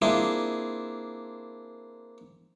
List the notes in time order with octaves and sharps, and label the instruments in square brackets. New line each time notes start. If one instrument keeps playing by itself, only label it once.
[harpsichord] A#3 C4 D4 E4 F4 G#4